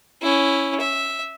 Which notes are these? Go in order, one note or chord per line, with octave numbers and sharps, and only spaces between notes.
C#4 E4
E5